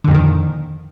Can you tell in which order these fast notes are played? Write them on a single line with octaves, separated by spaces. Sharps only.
D3 F2 A#2 D#3